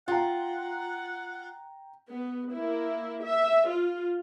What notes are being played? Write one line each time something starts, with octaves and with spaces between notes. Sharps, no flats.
F4 F#5 G5 A#5
B3
A#3 E4
E5
F4